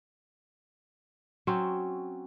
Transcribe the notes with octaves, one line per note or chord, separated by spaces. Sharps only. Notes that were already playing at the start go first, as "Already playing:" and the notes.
F#3 C4 C#4